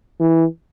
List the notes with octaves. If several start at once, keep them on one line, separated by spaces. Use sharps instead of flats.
E3